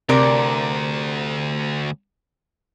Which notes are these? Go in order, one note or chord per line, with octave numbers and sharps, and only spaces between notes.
D2 C3 A#4 D5